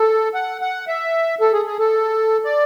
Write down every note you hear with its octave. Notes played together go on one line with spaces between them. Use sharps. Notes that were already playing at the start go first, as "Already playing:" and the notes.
Already playing: A4
F#5
F#5
E5
A4
G#4
G#4
A4
D5